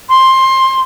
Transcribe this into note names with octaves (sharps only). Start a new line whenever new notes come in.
C6